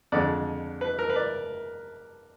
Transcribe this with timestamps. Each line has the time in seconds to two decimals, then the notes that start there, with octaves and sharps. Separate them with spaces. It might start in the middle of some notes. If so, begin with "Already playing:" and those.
0.12 F2 D3 G#3 D5
0.81 B4
0.99 A#4
1.10 B4
1.16 D5